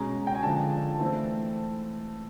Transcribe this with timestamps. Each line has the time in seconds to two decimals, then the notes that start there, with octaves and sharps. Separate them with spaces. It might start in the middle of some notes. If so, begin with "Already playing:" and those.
Already playing: B2 G#3 C#4 A#5
0.27 G5
0.35 G#5
0.43 D3 F3 G#3 A5
0.99 E3 A3 C4